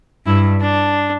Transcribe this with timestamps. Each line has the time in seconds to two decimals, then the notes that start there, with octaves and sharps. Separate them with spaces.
0.26 G2 E4
0.60 D4